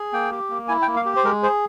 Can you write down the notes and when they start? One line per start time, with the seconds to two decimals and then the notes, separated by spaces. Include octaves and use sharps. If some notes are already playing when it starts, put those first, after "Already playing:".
Already playing: G#4
0.13 A#3 G5
0.32 G4
0.50 A#3
0.68 E4 G#5
0.82 G5
0.87 A#3
0.96 F5
1.06 G4
1.16 C5
1.24 G#3 A#4
1.43 G#4 C5